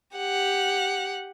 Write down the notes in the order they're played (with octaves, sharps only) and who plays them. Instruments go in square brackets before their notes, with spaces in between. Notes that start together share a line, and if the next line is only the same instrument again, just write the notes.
[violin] G4 F#5